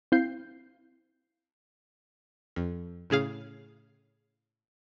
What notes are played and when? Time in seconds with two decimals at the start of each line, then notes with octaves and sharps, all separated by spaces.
0.12 C4 E4 F5 G6 C7
2.56 F2
3.10 A2 C#3 G#4 F5